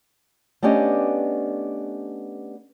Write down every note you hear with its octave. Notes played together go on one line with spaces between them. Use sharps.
A3 B3 C#4 D4 G4 D#5